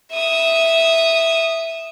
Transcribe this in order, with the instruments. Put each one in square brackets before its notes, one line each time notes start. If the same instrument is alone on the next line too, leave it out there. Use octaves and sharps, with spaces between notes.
[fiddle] E5 D#6